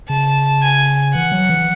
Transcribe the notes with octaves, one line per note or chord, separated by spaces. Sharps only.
C#3 A5
G#5
E3 F#5
F#3
E3